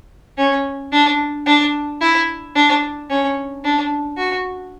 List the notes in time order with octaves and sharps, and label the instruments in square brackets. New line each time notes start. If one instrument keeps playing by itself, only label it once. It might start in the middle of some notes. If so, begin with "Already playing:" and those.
[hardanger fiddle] C#4
D4
D4
E4
D4
C#4
D4
F#4